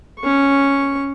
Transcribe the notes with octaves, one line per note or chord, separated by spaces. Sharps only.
C#4 C#6